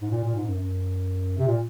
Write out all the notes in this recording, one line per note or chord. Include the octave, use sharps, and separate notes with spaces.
G#2
A#2
A#2
G#2
F#2
F#2
C3
A#2